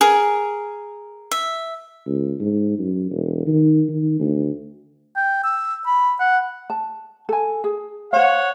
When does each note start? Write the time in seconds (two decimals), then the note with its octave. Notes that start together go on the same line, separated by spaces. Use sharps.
0.01 G#4 A#4
1.32 E5
2.06 C#2
2.40 G#2
2.79 F#2
3.11 E1
3.47 D#3
3.89 D#3
4.20 D2
5.16 G5
5.44 E6
5.86 B5
6.20 F#5
6.70 A5
7.29 A4 G#5
7.64 G#4
8.13 C5 C#5 F5 F#5